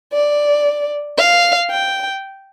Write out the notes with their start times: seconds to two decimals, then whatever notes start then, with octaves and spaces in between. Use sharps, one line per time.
0.13 D5
1.18 F5
1.71 G5